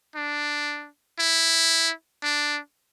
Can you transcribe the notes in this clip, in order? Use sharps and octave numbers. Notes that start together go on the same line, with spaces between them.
D4
E4
D4